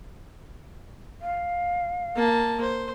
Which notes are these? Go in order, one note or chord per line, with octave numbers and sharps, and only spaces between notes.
F5
A#3 A5
C5